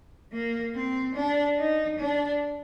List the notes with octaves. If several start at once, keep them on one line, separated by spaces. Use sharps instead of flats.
A#3
C4
D4
D#4
D4